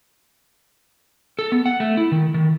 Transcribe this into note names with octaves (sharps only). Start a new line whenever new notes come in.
A4
B3
F#5
A3
E4
D#3
D#3